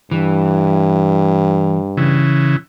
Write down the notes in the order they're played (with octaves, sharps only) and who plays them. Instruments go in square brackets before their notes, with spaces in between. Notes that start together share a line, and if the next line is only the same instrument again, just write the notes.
[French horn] G2 [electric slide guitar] E3
[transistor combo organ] C#3 E3